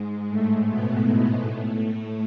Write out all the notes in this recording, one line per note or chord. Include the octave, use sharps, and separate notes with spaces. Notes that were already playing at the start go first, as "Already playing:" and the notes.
Already playing: G#2 G#3
A2 A3
B2 B3
A2 A3
A2 A3